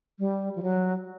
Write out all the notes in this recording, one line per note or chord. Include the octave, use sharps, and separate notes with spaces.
G3
F3
F#3